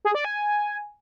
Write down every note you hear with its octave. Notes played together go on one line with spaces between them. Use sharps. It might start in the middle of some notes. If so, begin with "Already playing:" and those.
G#4
D5
G#5